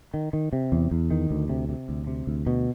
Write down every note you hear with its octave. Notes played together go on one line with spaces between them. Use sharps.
D#3
D#3
C3
E2
E2
D#3
D2
C3
C3
D2
C3
D2
B2